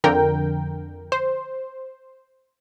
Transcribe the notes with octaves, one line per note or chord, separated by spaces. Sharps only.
F2 D3 A#4 G5
C5